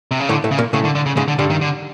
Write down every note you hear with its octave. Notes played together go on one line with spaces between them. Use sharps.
C3
C#3
A2 D3 A3
A2 A3
C#3
A#2 A#3
A2 C#3 A3
D3
D3
C#3
G#2 C#3 G#3
D3
G2 D3 G3
D#3
D3